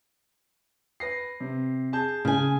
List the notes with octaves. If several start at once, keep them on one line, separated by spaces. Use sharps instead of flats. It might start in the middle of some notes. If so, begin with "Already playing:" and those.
B4 A#6 C7
C3
G#4 A5 G6
C#3 G#5